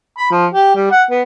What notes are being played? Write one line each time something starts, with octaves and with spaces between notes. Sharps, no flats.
B5
F3
G4
G3
F#5
B3